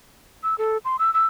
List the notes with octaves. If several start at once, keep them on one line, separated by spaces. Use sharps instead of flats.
E6
A4
C6
E6
E6